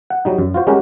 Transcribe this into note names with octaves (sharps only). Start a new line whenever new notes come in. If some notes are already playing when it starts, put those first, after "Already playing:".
F#5
F#3 G3 D#4
F#2
F4 F#4 C5
G3 G#3 C#4 G4 A#4 F#5